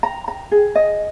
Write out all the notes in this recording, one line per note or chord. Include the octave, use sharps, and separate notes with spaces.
A#5
A#5
G#4
D#5